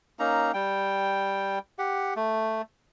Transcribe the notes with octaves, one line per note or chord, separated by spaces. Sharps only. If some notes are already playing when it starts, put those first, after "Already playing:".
A#3 C#4 D#4 A#5
G3 G5
G4 F#5
A3